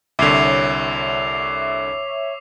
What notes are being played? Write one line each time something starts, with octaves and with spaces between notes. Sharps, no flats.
C2 D3 C#5 E5 D6 C7 F7